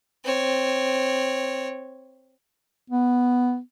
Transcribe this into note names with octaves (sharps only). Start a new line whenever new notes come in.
C4 C#5
B3